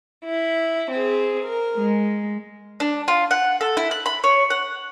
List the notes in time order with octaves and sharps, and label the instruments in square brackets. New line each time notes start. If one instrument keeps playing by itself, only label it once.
[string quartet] E4
C4 G#4
A#4
G#3
[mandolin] D4
F4
F#5
A4
E4
F#6
B5
C#5
F#5